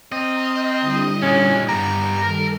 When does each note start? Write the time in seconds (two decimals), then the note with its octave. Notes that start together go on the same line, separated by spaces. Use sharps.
0.12 C4 D#5 A#5 F6 G6
0.81 D3 G3 E4
1.22 A#2 G#3 C#4
1.69 G2 G3 B3 A#5 G6
2.22 D#3 G3 A4 A#4